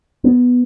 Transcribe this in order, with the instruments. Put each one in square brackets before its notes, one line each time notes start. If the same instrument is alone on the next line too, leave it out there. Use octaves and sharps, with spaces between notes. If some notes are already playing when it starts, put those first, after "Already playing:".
[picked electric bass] B3